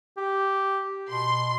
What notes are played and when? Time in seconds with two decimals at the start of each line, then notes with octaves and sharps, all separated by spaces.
0.17 G4
1.10 B2 C6